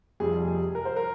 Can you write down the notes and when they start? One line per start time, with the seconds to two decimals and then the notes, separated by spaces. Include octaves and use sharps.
0.20 F2 C3 G3 G#4
0.48 G#4
0.75 A#4
0.85 C5
0.96 A#4